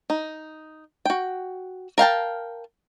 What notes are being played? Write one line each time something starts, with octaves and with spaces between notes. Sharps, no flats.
D#4
F#4 G5
A#4 F5 G5 A5